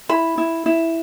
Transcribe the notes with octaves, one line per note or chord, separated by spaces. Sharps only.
E4 B5
E4
E4